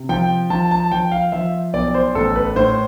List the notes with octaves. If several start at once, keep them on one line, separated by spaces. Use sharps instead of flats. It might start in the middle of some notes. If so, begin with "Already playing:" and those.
Already playing: C3
F3 G5
F3 A5
A5
F3 G5
F5
F3 E5
B1 D5
C5
A1 A4
B4
A2 C5